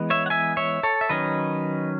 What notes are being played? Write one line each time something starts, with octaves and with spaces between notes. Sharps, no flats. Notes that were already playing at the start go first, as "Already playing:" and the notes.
Already playing: E3 G#3 B3
C#5 E5
F#5
E5 G#5
C#5 E5
A4 C#5
E5
D#3 F#3 C#4 B4 D#5